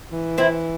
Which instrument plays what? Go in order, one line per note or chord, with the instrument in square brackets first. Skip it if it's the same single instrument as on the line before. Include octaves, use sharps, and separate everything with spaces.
[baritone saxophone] E3
[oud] C4 E4